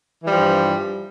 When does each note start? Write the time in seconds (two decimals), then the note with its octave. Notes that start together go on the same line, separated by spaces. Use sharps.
0.22 E3
0.27 G3
0.31 F3
0.35 G2